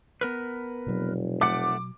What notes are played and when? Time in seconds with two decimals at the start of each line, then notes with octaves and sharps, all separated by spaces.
0.21 B3 A#4 B4
0.86 F1 B2 F#3
1.41 A3 F#5 D6